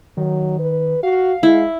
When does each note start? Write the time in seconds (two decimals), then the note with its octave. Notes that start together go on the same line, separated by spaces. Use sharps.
0.17 D#3 F#3
0.59 B4
1.03 F#4 F5
1.43 G#3 E4